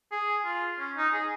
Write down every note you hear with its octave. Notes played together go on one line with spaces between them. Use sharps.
G#4
F4
C#4
D#4
G#4